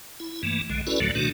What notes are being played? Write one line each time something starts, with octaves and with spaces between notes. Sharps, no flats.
E4
G2 E3 A3 A#3
B1 D3 G#3
C#4 E4 F#4 A4 B4 D5
D2 A2 D3 F3 F#3 A3
B2 D#3 A3 D4 F#4